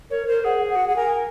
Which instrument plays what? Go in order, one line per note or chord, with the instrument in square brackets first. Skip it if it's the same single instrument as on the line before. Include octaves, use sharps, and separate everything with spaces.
[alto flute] A#4 [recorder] C#5
[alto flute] A#4 [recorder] C5
[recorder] G#4 [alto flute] F#5
[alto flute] F#5
[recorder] F#4
[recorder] G#4 [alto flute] F#5
[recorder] A#4 [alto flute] G#5